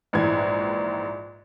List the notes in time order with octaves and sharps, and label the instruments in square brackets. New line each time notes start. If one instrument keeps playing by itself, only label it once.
[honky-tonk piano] A#1 G#2 E3 G#6